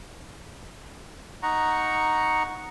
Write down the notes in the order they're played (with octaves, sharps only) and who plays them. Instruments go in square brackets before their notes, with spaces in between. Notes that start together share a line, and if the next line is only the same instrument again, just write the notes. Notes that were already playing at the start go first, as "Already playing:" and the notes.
[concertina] D#4 F#5 A#5 C#6